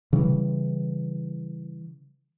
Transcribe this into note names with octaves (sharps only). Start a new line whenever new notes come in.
C#3 E3 G3